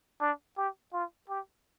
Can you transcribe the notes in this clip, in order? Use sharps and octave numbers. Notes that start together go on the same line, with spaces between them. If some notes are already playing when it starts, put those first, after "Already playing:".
D4
G4
F4
G4